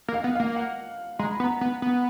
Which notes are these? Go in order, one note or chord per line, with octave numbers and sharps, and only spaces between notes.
A#3
F5
B3
F5
A#3
F#5
G#3 A#5
B5
B3
A#5
B3
B3